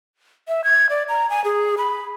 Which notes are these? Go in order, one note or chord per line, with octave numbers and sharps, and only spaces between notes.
E5
G#6
D5
A#5
G#5
G#4
B5